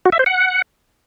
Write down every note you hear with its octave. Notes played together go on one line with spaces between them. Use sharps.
F#4
E5
C5
F#5